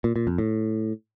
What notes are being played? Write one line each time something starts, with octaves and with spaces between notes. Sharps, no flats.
A#2
A#2
F2
A2